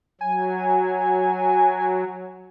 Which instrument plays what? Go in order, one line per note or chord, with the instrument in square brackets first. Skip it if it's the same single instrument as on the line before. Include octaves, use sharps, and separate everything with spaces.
[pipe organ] F#3 [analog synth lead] G#5